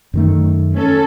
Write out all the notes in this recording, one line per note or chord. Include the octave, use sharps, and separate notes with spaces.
F#2 D#3 A3
C#4 A4